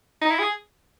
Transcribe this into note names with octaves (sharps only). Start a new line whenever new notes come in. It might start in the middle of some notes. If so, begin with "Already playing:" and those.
D#4
E4
G#4